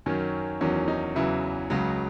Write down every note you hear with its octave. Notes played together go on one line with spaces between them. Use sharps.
F#2 D#3 F#3 C#4
E2 D#3 F#3 C#4
D#4
E2 C#3 E3 F#3 E4
C#2 C#3 F#3 F#4